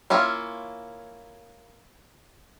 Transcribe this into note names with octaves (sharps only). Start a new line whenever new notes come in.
A#3 C#4 E4 F4